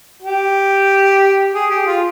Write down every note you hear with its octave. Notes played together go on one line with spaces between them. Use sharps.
G4
G#4
G4
F4